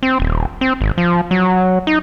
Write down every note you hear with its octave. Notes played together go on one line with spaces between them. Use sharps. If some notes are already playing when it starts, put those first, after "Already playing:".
C4
D#1
C4
G#1
F3
F#3
D#4